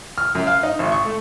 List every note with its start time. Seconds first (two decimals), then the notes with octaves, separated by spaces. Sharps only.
0.18 F6
0.35 F#2
0.47 F5
0.63 D#4
0.79 G#1
0.92 C#6
1.05 A3